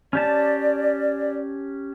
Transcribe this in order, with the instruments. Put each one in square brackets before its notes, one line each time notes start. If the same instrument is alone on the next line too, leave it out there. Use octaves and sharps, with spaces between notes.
[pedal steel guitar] C#4 G4 A5 [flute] D5